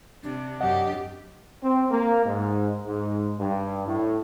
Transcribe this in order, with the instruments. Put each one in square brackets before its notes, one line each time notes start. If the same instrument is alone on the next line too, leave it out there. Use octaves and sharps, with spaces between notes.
[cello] C3 [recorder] D4
[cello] F#2 G4 [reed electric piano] D#5 F#5
[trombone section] C4
A#3
G#2
G#2
G2
A2